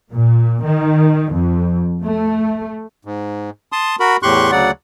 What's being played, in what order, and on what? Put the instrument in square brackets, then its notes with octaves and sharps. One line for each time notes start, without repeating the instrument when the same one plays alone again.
[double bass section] A#2
D#3
F2
A3
[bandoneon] G#2
A5 C6 D#6
F#4 A#4 B5
E2 A2 G4 C6 C#6 F#6
D2 C#3 F#3 D5 F#5